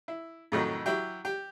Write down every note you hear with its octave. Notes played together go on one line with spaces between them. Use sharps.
E4
F2 A2 D#3 F#3
F#3 E4 G4
G4